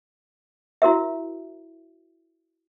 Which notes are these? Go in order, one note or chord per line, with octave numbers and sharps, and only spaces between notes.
E4 F#4 A#4 E5